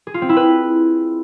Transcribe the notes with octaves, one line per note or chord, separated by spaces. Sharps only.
G#4
F4
C4
E4
B4